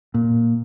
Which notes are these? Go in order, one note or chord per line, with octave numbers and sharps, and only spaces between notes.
A#2